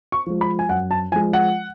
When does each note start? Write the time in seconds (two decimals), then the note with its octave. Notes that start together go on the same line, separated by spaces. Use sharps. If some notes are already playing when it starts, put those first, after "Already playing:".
0.12 C#6
0.26 F3 G#3
0.41 B5
0.59 G#5
0.69 F#2 F#5
0.91 A5
1.12 F3 G#3 G#5
1.33 F#5